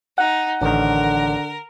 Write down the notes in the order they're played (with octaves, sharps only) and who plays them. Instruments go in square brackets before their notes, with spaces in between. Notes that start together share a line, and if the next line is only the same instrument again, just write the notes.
[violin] D#4 [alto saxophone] F#5
[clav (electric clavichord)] A1 D#3 [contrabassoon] D3 [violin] A#4